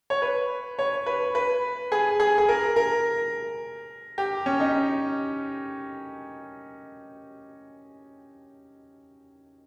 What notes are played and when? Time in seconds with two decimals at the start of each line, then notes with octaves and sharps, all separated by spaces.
0.10 C#5
0.22 B4
0.79 C#5
1.06 B4
1.35 B4
1.92 G#4
2.20 G#4
2.38 G#4
2.49 A#4
2.76 A#4
4.18 G4
4.46 C#4
4.60 D#4